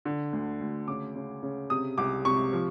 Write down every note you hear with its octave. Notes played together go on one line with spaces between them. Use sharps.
D3
D2
D2
C#3 D6
C#3
C#3
C3 D#6
C2 D6
C3 C#6
F3